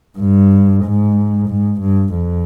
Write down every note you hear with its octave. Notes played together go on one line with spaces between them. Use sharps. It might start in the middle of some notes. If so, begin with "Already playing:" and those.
G2
G#2
G#2
G2
F2